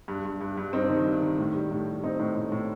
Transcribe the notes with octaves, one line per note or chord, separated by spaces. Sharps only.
G2
G2
G2
G2
G2 C4 D#4
D#3
G2
D#3
A2
G3
A2
G3
A2 C4 D#4
A2
A2
A2